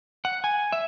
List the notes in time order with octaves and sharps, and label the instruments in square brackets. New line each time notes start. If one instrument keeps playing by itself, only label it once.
[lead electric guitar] F#5
G#5
E5